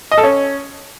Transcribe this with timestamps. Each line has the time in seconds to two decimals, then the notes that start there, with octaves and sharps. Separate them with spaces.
0.11 D#5
0.17 A4
0.23 C#4